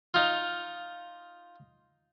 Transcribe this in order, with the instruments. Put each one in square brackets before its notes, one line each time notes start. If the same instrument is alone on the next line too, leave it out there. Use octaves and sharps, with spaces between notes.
[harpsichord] D#4 F4